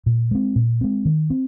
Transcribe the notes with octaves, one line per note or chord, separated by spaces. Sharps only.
A#2
G#3 C4
A#2
G#3 C4
D#3
C4